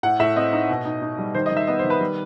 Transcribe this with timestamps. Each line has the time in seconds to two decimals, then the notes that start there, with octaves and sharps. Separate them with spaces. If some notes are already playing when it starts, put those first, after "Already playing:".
0.03 A2 F#5
0.19 A2 E5
0.36 C4 D#5
0.53 D#4
0.69 B2
0.85 D#4
1.02 D#4
1.19 G3
1.35 D#3 C5
1.46 D#5
1.51 D#3
1.57 E5
1.67 B3 D#5
1.79 C5
1.84 D#3
1.90 B4
2.00 G3